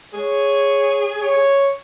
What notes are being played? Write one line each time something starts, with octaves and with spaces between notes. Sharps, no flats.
G#4 C#5
C#5